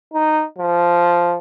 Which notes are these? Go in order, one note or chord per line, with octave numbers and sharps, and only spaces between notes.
D#4
F3